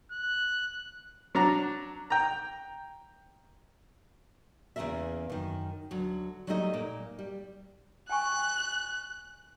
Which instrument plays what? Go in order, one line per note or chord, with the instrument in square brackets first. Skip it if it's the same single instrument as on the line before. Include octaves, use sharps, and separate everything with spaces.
[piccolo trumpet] F#6
[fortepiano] F#3 D4 A#5
G5 A#5
[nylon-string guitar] E2 C#3 F3 A#3 A#4 E5
F#2 D#3
D2 F#3
F#3 G3 A3 A#3 D#4 D#5
A#2 A#3
G3
[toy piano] G5 G#5 C#6 [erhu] F#6